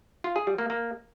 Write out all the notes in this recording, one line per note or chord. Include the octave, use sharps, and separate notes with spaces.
F4
G#4
G3
A#3
A#3